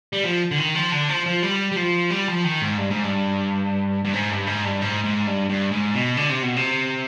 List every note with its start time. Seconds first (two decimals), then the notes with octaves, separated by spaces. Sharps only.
0.13 G3
0.24 F3
0.51 D3
0.58 D#3
0.75 F3
0.92 D3
1.09 F3
1.26 F3
1.43 G3
1.71 G3
1.76 F3
2.10 G3
2.28 F3
2.44 D#3
2.61 G#2
2.78 G2
2.90 G#2
3.04 G2
4.04 G2
4.13 G#2
4.30 G2
4.47 G#2
4.65 G2
4.82 G#2
5.04 G#2
5.27 G2
5.49 G2
5.71 G#2
5.94 B2
6.17 D3
6.30 C3
6.43 B2
6.56 C3